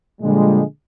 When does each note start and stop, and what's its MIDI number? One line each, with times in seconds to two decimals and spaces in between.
0.21 0.62 46
0.21 0.62 50
0.21 0.62 53
0.21 0.62 55
0.21 0.62 56